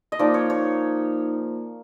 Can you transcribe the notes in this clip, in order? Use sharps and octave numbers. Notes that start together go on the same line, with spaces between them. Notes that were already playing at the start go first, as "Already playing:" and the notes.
D#5
F3 A#3 D#4 D5
C#5
C#5